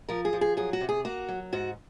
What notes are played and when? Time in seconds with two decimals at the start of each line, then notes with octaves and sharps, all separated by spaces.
0.09 F3 A#4
0.25 G#4
0.33 F3
0.41 G#4
0.57 F#3 G#4
0.73 F#4
0.81 C3
0.89 G#4
1.05 A#3 F#4
1.28 F#3
1.53 G#2 F#4